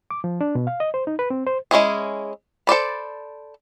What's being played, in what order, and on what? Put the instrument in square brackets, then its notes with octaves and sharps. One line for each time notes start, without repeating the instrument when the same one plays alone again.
[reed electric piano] D6
F3
D4
B2
F5
D#5
C5
D#4
B4
C4
C5
[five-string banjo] G#3 C#4 E4 G#4
A4 C5 D5 B5